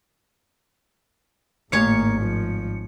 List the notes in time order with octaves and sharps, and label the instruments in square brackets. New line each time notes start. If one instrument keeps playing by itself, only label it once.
[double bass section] G#1 [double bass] A2 A#3 [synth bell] A3 C#7 [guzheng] C#5 F5
[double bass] F3